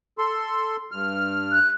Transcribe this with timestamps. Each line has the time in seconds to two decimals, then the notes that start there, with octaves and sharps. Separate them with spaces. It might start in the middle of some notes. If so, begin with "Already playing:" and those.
0.18 A4 C6
0.92 G2 F6
1.52 F#6